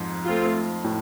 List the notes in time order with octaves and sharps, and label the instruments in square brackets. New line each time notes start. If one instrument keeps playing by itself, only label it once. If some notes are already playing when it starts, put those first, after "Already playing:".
Already playing: [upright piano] F2 G#2
[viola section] A3 C4 F4
[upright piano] A2